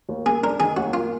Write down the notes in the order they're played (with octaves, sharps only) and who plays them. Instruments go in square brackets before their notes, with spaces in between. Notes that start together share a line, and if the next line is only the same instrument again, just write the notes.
[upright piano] D#2
[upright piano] A#3 [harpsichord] G#4
[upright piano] D4 [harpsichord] A#4
[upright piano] D#3 [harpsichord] G#4
[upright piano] D#2 [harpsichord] F#4
[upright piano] A#3 [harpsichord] F4